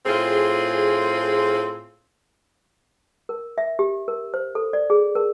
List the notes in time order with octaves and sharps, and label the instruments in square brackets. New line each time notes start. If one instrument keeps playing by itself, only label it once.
[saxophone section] A2 C4 F4 G#4
[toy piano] A#4
E5
G4
A#4
C5
A4
D5
G#4
A#4